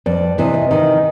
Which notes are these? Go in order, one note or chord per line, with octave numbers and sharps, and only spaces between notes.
F2 D5
C3 E3 D#5
D#5
D#3 D#5